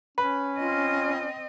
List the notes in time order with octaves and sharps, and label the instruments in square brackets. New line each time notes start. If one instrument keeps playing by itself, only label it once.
[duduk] C#4 [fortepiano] B4
[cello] C4 D#5 [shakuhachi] F4